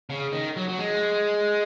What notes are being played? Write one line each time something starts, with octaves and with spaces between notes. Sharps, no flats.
C#3
D#3
F#3
F#3
G#3